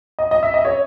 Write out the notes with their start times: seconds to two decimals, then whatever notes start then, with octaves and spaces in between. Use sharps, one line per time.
0.19 D#5
0.31 D#5
0.43 E5
0.54 D#5
0.65 C#5